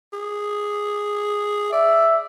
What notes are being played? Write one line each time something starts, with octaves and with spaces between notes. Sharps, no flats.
G#4
D5 E5